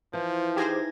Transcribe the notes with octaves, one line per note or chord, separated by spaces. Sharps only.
E3 F3 C5
D#4 G4 G#4 C5 G#6 A#6